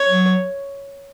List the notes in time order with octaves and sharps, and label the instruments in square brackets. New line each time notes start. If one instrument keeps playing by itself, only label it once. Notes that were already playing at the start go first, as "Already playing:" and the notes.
Already playing: [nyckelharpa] C#5
[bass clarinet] F#3